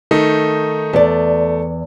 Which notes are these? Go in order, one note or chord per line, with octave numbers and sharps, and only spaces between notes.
D#3 A3 D#4
E2 A3 D5